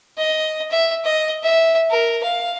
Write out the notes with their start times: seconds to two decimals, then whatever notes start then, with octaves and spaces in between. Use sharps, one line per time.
0.18 D#5
0.71 E5
1.05 D#5
1.43 E5
1.90 A#4
2.23 F5